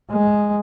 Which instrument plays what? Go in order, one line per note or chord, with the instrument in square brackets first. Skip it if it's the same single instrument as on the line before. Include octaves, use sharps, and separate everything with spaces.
[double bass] G#3